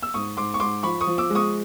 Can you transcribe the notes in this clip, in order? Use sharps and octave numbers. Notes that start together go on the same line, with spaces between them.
E6
G#2 C#6 D#6
G#2 C6 D6
C#6
G#2 C6 D6
F3 B5 C#6
C#6 D#6
F3
D6 E6
G#3
C#6 D#6